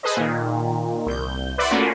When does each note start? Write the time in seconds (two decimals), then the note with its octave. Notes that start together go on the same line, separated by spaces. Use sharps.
0.03 G#4 A4 B4 C5 D#5
0.17 A#2 D#3
1.06 C2 G6
1.58 B4 D5 E5 F#5 B5 C6
1.71 A3 A#3 C#4 F4 F#4